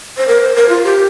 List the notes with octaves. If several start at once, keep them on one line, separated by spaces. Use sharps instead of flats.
C5
A#4
C5
A#4
F4
G4